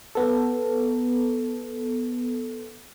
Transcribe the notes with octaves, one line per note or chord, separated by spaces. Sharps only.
B3 A4